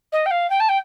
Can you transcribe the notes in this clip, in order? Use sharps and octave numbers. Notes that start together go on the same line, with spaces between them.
D#5
G5
F5
G5
A5
G5